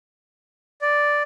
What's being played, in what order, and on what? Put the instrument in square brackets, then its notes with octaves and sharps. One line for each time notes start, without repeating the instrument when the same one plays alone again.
[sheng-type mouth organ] D5